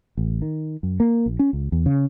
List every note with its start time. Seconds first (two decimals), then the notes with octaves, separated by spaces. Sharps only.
0.17 A1
0.42 D#3
0.83 F#2
1.00 A#3
1.26 A#1
1.39 C#4
1.53 C#2
1.72 E2
1.86 C#3